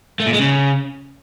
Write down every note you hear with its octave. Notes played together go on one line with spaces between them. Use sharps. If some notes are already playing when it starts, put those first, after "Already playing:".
A3
A#2
G#3
C#3